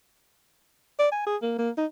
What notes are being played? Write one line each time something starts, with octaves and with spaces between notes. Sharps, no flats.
D5
G#5
G#4
A#3
A#3
D#4